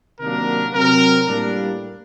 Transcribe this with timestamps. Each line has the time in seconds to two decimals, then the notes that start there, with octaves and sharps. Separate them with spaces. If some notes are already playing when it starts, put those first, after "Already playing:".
0.20 C3 D#3 F#3 A#3 D4 A#4
0.74 C3 F#3 C4 A#4
1.28 A2 G3 A#3 D4